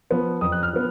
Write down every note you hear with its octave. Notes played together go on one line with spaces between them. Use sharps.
F3 B3
F2 D#6
F#6
F6
F3 B3